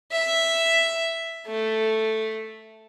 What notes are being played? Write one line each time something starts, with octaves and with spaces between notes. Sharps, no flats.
E5
A3